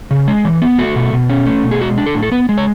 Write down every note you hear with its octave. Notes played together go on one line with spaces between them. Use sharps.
C#3
G#3
E3
B3
A3 F#4
B2
B2
C#4
A3
B2
G#4
G#3 F#4
D4
A4
A2
A4
B3 B4
G#3
C#5